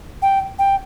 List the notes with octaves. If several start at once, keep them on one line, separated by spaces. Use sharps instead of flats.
G5
G5